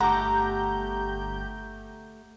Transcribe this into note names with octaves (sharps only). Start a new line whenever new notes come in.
G1 A3 G4 F#5 A#5 D6 G6